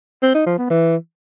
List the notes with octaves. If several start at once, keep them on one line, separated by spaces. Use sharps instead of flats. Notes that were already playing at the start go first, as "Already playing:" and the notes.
C4
D#4
F3
B3
E3